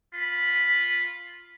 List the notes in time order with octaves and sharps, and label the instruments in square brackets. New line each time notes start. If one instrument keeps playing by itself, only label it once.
[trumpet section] F4 B5